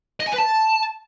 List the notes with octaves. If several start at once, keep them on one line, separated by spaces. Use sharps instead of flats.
D#5
G#5
B4
A5